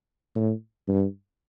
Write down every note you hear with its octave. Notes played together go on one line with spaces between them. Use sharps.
A2
G2